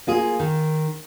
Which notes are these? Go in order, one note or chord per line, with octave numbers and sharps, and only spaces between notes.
A#3 F4 G#4
D#3